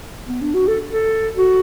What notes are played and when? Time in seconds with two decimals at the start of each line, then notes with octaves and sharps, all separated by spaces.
0.28 B3
0.41 D4
0.54 F#4
0.68 A4
0.89 A4
1.36 F#4